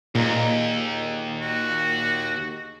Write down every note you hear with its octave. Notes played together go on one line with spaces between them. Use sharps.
D#2 A#2 D#4 G#4
F#4